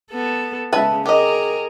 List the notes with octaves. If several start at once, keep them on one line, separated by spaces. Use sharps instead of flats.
B3 A4
C#3 G#3 B4 E5 A5
G4 G#4 A#4 D#5